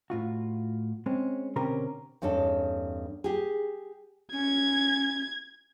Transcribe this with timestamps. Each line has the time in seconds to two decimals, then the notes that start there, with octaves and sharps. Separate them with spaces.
0.10 A2 F4 F#4
1.06 G#3 C4 C#4
1.56 B2 D3 C4 C#4 G4 A#4
2.22 E2 G2 C#4 D#4 A4
3.24 G4 G#4
4.33 C#4 G#6